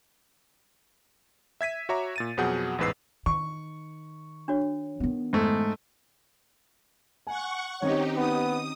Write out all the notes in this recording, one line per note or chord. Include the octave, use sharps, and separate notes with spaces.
E5 G#6 B6 D#7
F#4 C#5 E5 A#5 D6
A#2 A6 D#7
F2 B2 F#3 G#4 F#5 G6
A1 E2 G#2 B4 E6 C7
D#3 C#6
D4 F#4 C#5
D#3 B3
G#2 A3
F#5 G#5 C#6
D#3 C4 C#4 D#4 G4 C#5
B3 D#6